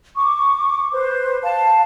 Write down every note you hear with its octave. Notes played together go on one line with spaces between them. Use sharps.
C#6 D6
B4 C5
F5 A5